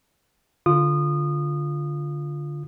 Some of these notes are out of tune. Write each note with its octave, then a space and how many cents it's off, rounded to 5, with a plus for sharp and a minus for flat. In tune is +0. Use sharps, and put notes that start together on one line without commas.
D3 -5 F4 +0 D#6 -25